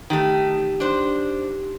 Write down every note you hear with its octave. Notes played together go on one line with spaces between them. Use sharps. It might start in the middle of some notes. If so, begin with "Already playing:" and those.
D#3 A3 D#4 G4
D4 C5